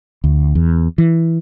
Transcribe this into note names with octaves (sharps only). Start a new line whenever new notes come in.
D2
E2
E3